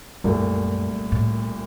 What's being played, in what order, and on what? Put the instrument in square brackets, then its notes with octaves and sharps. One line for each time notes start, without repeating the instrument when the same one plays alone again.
[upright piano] C2 A#2 A3 [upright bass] F#2
[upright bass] A2